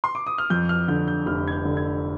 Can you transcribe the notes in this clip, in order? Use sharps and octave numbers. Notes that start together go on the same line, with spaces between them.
C6
D6
D#6
F6
F2 G6
F6
D3 G6
G6
F1 F6
G#6
G6
D3
G#6